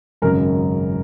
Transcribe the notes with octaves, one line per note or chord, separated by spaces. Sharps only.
G#1 F#2 C#3 A#4